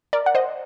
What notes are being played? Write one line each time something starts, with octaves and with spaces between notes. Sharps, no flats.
A#4 D5
F#5
C5 D#5